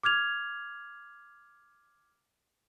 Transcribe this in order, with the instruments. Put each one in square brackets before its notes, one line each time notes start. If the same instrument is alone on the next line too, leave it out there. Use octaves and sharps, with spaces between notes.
[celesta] D6 F6 G#6 F7